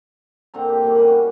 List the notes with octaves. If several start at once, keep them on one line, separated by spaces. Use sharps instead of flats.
A#2 D3 C4 A#5
G4
G2 A#2 D#3
C#3 G3 B4 F#5
F#4 B4